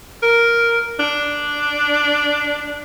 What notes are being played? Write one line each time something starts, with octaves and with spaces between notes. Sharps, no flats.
A#4
D4